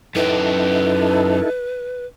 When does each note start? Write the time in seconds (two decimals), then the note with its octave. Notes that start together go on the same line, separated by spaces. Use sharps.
0.15 F#2 D#4 E4 G4 A4 B4